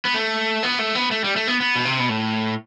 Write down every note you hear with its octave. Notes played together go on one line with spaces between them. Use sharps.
B3
A3
B3
A3
B3
A3
G3
A3
B3
B3
B2
C3
B2
A2